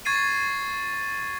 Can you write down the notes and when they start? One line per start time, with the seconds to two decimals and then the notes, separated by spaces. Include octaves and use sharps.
0.05 C#6 G#6 A6 C7 D#7